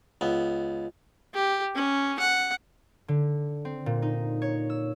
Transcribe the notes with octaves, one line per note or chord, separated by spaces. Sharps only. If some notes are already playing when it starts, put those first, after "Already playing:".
C#2 B3
G4
C#4
F#5
D3
C4
A#2
D#4
C#5
E6